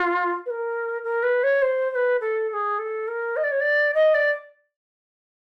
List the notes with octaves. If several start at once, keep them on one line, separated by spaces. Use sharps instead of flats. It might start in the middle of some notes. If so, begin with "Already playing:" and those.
Already playing: F4
B4
A#4
A#4
B4
C#5
C5
C5
B4
A4
A4
G#4
A4
A#4
D#5
D5
C#5
D5
D#5
D5